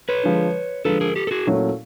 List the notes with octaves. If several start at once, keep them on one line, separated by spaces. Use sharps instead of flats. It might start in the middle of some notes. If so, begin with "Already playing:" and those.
B4 C#5
D3 F3 G#3
D3 F3 G#3 A4 B4
G#4 A#4
G4 A4
A4
F#4 G#4
A#2 F#3 A3 C#4 E4